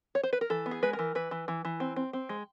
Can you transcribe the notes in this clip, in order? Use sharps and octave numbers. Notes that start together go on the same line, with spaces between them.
C#5
C5
B4
A#4
E3 A4
B3
G#4
G#3 B4
A#4
E3
E3 B4
E3
E3
E3
C4
C4
C4
G#3